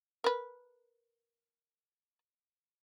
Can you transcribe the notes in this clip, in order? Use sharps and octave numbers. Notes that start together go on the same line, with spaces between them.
A#4 B4